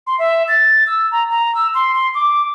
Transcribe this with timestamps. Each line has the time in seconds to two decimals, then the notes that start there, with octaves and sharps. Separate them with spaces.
0.07 C6
0.19 E5
0.48 A6
0.87 E6
1.11 A#5
1.30 A#5
1.55 E6
1.74 C6
1.94 C6
2.14 D6